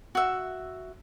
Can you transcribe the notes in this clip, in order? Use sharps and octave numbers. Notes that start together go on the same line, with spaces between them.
F#4 E5